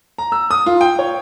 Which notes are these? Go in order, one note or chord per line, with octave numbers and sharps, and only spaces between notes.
A#5
E6
D#6
F4
G5
C#5